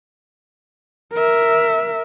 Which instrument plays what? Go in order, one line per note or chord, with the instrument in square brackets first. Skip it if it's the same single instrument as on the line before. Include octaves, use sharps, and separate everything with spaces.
[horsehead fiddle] A#4 E5